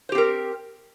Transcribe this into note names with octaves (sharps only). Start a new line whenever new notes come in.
C4 G4 A#4 C5